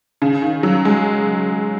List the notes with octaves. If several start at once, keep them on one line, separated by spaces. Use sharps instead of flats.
C#3
D#3
F#3
G#3